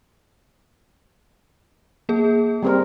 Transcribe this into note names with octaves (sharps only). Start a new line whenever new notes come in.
A#3 G#4
G3 C4 A#4